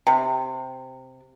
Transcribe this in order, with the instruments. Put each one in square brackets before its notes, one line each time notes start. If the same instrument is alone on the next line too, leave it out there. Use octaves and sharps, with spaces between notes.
[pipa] C3